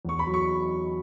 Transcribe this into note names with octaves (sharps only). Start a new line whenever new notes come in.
E2 C#6
B5
F#3
C#6